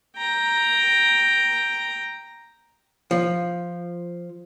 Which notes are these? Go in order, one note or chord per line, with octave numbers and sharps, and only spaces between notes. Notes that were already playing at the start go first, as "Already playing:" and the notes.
G5 A#5
F3